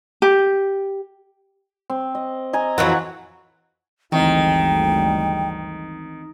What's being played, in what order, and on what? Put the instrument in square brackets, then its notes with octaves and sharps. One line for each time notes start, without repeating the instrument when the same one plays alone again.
[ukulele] G4
[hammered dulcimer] C4
D#5
D#5 G#5 A#5
[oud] F2 E3 F#3 [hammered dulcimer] F#5 C#6
[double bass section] G1 D2 G#3 [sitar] D#3 [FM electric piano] E3 C4 D#5 [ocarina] G5